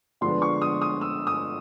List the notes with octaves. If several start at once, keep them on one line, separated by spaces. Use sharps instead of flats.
D3 F3 G#3 B3 D4 C6
C#6
D#6
D#6
E6
D#6